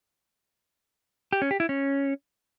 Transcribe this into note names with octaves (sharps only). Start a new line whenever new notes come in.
G4
C#4
G4
E4
C#4